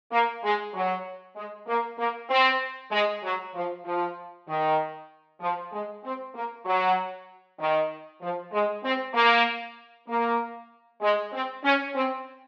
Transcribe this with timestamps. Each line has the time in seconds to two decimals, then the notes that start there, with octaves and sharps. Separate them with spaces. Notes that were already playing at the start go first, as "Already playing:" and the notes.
0.12 A#3
0.43 G#3
0.74 F#3
1.36 G#3
1.67 A#3
1.98 A#3
2.30 C4
2.91 G#3
3.24 F#3
3.54 F3
3.85 F3
4.48 D#3
5.41 F3
5.72 G#3
6.04 C4
6.35 A#3
6.65 F#3
7.60 D#3
8.21 F3
8.52 G#3
8.84 C4
9.14 A#3
10.08 A#3
11.01 G#3
11.33 C4
11.64 C#4
11.95 C4